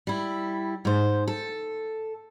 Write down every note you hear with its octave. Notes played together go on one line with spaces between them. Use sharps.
G3 E4
G#2 C5
A4